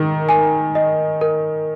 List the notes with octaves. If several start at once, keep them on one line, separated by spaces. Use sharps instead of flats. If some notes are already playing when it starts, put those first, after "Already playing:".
Already playing: D#3 A#4
G#5
D#5
A#4